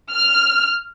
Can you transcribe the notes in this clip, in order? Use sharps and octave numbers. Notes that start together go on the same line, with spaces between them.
F6